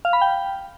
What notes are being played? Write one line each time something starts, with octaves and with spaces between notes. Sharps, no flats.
F5
B5
G5